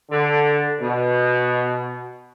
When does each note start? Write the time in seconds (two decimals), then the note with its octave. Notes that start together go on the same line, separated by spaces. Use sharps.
0.10 D3
0.80 B2